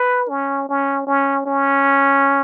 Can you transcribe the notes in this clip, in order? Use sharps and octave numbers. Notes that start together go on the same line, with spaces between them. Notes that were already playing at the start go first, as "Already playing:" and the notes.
Already playing: B4
C#4
C#4
C#4
C#4